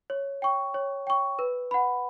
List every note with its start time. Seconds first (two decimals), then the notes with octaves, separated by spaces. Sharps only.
0.10 C#5
0.42 G5 C#6
0.74 C#5
1.07 G5 C#6
1.39 B4
1.71 F#5 B5